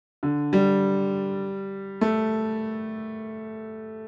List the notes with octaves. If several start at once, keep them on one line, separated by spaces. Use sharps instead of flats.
D3
G3
A3